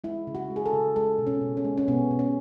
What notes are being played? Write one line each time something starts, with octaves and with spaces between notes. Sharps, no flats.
G#3 E4
C#3
F#4
G#3
G#4
A4
C#3
G#3 A4
B2
C#4
B2
C#4
G#3
C#4
B2 B3
B2
C#4